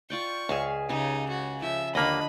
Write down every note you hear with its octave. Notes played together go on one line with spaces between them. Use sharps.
F4 D5 G5 C#6
C#2 G#4 E5 F5
C#3 D#4 G4
F#4
F3 E5
D#2 D3 A#3 D4 D#5 B5